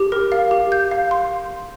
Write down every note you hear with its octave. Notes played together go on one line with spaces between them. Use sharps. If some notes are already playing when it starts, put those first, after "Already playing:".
Already playing: G4
A#4
F5
G4
G6
F5
C6